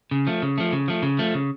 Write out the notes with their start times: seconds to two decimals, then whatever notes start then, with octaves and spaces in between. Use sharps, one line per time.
0.11 C#3
0.27 F3 A3
0.42 C#3
0.58 F3 A3
0.72 C#3
0.88 F3 A3
1.02 C#3
1.19 F3 A3
1.34 C#3